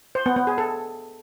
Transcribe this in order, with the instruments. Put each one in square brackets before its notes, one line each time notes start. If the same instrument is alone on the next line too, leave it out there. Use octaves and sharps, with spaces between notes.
[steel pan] C5
B3
B3
G#4
A4